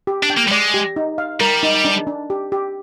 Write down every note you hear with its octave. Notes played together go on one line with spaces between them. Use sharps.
G4
D4
G5
A#3
G3
G#3 D5
G4
D#4
F5
G3 A#4
D#4
D4
D4
G4
G4